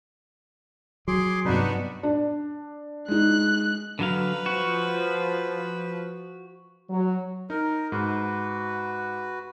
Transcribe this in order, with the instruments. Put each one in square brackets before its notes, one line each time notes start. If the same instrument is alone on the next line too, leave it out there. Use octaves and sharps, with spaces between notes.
[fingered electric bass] F#3 [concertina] G#4 C6 D6
[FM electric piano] G2 C3 [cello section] G3 B3 F#4 [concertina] D4 D#4 B4
[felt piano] D4
[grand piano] G#3 D#4 [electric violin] F#6
[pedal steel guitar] D3 F#3 F5 [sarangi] B4
[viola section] F3 [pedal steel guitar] F#4
[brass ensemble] F#3
[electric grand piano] D#4 [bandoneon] A#4
[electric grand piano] G#2 [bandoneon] F#4 B4